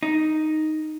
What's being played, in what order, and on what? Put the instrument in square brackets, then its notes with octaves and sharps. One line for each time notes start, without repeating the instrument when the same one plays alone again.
[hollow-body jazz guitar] D#4